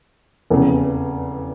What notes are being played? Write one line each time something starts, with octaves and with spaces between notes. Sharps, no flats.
F1 E2 C#3